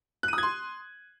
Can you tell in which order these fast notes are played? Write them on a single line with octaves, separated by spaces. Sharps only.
F#6 D#7 D#6 G#6 C6